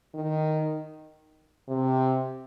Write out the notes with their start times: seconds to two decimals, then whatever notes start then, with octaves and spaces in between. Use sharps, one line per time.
0.14 D#3
1.69 C3